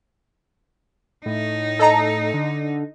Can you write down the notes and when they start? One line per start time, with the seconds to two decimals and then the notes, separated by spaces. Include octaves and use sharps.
1.26 A2 D#4
1.79 A4 D#5 A#5
2.34 D3